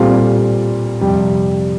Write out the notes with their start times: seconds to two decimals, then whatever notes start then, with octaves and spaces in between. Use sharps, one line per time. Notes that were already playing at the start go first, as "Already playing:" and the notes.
Already playing: A#2 G3 C4 F4 A4
1.01 F2 C3 G3